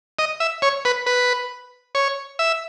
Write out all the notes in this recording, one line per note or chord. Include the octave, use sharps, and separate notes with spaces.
D#5
E5
C#5
B4
B4
C#5
E5